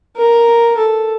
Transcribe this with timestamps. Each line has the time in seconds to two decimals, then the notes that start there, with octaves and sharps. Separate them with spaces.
0.17 A#4
0.78 A4